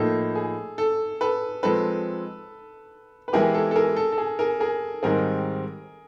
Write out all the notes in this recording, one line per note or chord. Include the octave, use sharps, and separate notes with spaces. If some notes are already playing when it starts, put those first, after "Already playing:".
Already playing: A2 F3 A#3 D#4 A4
G#4
A4
A4 B4
F3 G#3 C4 A4 B4
B4
E3 G#3 B3 E4 G4 G#4 A#4
A4
A4
G#4 A#4
A4
A4
G#4
G#4 A#4
G#4 A#4
G#2 D#3 G3 C4 G#4 A#4